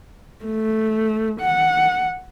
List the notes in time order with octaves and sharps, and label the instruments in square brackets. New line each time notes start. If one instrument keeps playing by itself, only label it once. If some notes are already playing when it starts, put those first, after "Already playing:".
[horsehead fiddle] A3
F#5